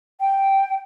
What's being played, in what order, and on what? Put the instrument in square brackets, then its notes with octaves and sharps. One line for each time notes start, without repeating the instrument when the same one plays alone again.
[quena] G5